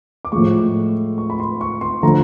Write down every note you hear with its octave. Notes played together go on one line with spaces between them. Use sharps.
D6
A2 F3 G#3 C#6
C#6
B5
C6
C#6
C6
D3 F3 A3 A#5